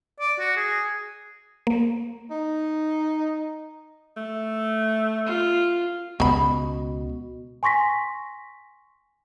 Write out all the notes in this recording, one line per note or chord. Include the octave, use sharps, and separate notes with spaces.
D5
F#4
G#4
A#3
D#4
A3
F4
C#2 B2 B3 B5
G#5 C6 C#6 A#6 B6